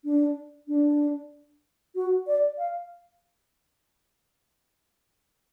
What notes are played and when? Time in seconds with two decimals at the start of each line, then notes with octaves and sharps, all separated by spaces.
0.05 D4
0.68 D4
1.95 F#4
2.27 D5
2.58 F5